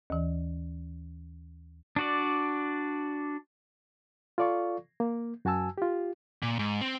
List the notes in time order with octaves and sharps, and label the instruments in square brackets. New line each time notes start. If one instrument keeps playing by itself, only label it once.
[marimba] D#2 E3
[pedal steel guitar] D4 F#4 D5
[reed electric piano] F4 A4 D5 F5 C#6
A#3
F#2 F#4 G#5 A5 E6
F4 G4
[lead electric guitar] A#2
G#2
C4